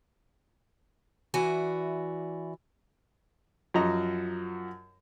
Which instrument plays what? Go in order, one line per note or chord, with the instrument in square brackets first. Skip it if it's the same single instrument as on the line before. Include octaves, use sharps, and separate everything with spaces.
[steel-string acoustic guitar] E3 F#4 D5 E5 G#5
[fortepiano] F#2 F3 F#4 D#5 A#5